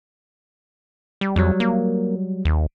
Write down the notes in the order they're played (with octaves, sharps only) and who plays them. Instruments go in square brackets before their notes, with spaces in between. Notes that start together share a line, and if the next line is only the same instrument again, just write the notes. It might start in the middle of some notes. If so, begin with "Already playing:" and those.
[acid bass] G3
[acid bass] F2 [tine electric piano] F#3 G3
[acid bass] A#3
D#2